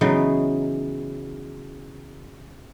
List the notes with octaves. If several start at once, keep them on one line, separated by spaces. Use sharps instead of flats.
C#3 E3 F#3 B3 D#4